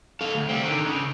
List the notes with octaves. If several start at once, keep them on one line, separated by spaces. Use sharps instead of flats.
A4 F5
D2
G3 C4
D3 D#3
C#2 C#3